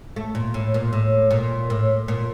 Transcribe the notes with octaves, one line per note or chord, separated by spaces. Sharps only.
A3
A#2
A2
A#2
A2
A#2
A2
A#2